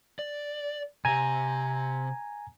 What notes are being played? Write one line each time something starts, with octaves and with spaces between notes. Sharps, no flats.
D5
C3 G4 G#5 A#5 G#6